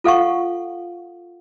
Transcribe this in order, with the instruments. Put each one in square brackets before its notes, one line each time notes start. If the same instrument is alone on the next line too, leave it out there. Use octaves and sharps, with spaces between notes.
[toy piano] F4 A4 F5 F#5 C#6